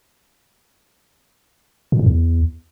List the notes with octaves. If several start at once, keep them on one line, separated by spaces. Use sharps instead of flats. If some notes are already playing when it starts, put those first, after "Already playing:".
A#2
A2
E2